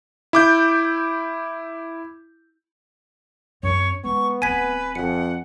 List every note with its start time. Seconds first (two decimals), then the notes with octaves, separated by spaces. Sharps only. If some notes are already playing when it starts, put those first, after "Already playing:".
0.33 E4 D6 G6
3.63 F#2 C4 C#5
4.04 G#3 B3 C#6
4.42 D1 C4 B4 G#5 G#6 B6
4.95 F2 F#5 C#7